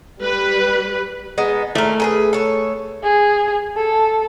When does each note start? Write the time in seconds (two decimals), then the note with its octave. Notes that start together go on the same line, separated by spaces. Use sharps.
0.21 G3 B4
1.38 G#3 B3 D#4
1.75 A#2 A3 A#4
2.00 G#4 A#4 B4
2.33 A4 C#5
3.04 G#4
3.76 A4